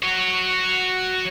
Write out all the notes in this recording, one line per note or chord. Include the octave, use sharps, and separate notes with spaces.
F#4 C#5